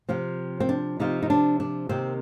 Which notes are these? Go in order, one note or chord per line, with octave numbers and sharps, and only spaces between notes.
C3 F3 C4
C4
D4
C3 F3 C4 D#4
D#4
D4
D4
C3 D#3 A#3 C4